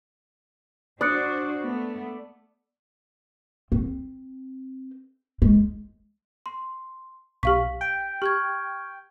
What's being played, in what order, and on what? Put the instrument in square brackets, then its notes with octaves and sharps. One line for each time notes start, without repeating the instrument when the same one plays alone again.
[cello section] D4 F#4 C5 [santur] D5 [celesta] D#6 F#6 C#7
[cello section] A3 B3
[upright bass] C4
G#3
[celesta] C6
[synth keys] B1 [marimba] G4 F5 C#6 [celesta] B6
[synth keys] G5
[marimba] G4 [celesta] C#6 F6 G#6